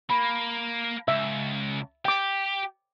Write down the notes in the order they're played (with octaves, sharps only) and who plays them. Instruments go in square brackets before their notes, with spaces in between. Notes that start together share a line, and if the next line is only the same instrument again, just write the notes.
[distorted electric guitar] A#3 [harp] B5
[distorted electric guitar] C#2 [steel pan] E5
[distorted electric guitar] G4 [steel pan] G5 D6